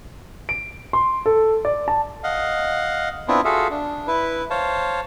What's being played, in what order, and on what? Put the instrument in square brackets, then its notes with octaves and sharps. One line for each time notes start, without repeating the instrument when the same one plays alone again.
[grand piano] D7
C6
A4
D5
A5
[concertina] D#5 F5 F#5
B3 C4 D4 E4 F4
F4 F#4 G#4 A4 E5 F5
D4
E4 B4
C5 C#5 F5 A5